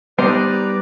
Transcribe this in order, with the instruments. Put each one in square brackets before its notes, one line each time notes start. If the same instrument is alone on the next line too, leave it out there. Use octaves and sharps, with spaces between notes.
[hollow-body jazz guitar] G3 B3 D#4 [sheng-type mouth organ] B4 D5 A#5 [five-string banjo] C5 [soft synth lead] D6